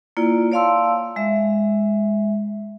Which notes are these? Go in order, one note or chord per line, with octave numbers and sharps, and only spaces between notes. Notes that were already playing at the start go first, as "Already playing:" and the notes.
A#3 E4 F4 D5
C#5 D5 F5 A5 C6 E6
G#3 E5